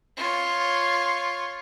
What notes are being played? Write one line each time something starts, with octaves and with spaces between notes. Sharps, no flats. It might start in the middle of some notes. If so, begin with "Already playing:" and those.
F4 C#5